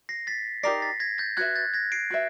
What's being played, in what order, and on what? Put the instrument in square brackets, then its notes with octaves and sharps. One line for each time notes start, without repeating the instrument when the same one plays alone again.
[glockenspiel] A#6 C7
A6 B6
[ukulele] D#4 G4 A#4 D5 [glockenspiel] A#6 C7
[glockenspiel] A6 B6
G#6 A#6
G6 A6
[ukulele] F#4 B4 E5 [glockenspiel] F#6 G#6
[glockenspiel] G6 A6
G#6 A#6
C7 D7
[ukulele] F#4 B4 E5